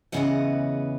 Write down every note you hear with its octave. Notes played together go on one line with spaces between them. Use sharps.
E2 C#3 E3 B3 D#5 F#5